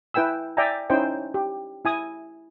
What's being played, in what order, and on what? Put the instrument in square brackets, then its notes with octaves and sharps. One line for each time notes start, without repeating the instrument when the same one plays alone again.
[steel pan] E4 B4 G5 G#5 E6
D5 E5 G5 G#5 A#5
C#4 D#4 E4 C5 G5
G4
E4 G#5 D#6